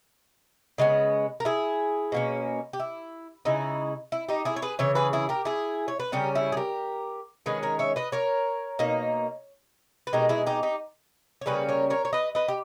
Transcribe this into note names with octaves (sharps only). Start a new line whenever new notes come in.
C#3 G#3 B3
A#4
E4 G#4
B2 A#3 C#4
G4
E4
C#3 G#3 D#4 E4
E4
D#4 G4
E4 G#4
C#5
G#4 B4
C#3 E3 C#5
G#4 B4
E4 G#4
G4 A#4
E4 G#4
C#5
B4
C#3 G3 C#4 G4 A#4
E4 G#4
G#4
G4 A#4
D#3 G#3 C#4 G#4 B4
A#4 C#5
C#5 E5
B4 D#5
A#4 C#5
B2 A#3 D#4
B4
B2 G#3 D#4 G4 A#4
E4 G#4
D#4 G4
D#4 G4
C#5
C#3 G3 A#3 C#4 G#4 B4
A#4 C#5
A#4 C#5
C#5
B4 D#5
B4 D#5
G4